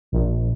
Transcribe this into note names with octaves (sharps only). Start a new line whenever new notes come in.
A#1